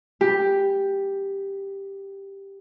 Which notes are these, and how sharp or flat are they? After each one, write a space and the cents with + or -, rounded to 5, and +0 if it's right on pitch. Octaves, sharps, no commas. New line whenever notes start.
G4 +5